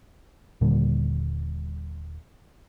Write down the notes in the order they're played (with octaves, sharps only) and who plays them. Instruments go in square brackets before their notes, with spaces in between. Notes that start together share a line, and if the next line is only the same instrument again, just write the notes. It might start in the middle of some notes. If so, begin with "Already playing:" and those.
[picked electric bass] D#1 A#2 D3 G3